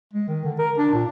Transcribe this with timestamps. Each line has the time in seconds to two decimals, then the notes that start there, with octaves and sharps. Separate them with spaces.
0.14 G#3
0.28 D#3
0.45 D3
0.59 A#4
0.78 D4
0.94 A#2